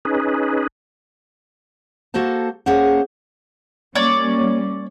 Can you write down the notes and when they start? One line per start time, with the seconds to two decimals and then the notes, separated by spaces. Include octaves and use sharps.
0.05 C#4 D#4 G#4 B4
2.14 A#3 F#4 A4 C5 A5
2.66 A#3 C#4 G#4 C5 F#5
3.95 G3 A#3 C#4 C#5 D5